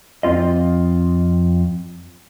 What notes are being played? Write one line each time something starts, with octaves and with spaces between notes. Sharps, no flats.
F2 C4 F4 D#5